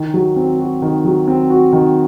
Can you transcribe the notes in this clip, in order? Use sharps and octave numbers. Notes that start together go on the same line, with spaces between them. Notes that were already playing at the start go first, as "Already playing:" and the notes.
Already playing: D#3
F#3
C4
F#4
D#3
F#3
C4
F#4
D#3